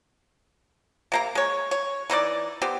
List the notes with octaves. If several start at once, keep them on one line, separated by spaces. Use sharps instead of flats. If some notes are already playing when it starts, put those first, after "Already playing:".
C3 A#3 A#5
G#3 C#5
C#5
E3 D#4 C5 D5
B3 C4 G4